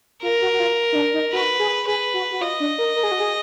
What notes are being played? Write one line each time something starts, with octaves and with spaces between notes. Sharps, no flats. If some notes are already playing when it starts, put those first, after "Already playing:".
F4 A#4
F#4
F#4
F4
D#4
D4
D#4
F#4 B4
G#4
G#4 B4
F#4
F#4
F4 D#5
D4
A#4
A#4
G#4
F#4
G#4